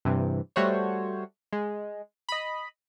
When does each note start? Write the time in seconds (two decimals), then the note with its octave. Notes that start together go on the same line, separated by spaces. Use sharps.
0.05 G2 C3 E3
0.56 G3 A3 F#4 C5 C#5
1.52 G#3
2.29 D#5 B5